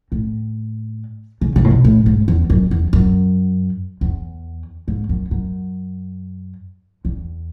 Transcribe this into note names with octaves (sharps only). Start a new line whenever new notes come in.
A2
C#3
C#3
A2
B2
A2
G#2
E2
F#2
E2
F#2
E2
G#2
F#2
F#2
E2